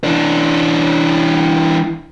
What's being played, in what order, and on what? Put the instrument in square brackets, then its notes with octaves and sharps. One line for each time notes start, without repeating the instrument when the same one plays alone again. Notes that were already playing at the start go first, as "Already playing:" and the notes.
[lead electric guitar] E3 D4